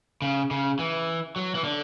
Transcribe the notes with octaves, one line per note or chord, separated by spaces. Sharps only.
C#3
C#3
E3
F#3
E3
D3